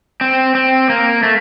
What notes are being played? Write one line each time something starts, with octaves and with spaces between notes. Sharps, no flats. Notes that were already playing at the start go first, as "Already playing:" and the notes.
C4
C4
A#3
A3